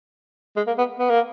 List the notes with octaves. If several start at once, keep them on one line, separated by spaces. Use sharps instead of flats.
G#3
A#3
B3
B3
A#3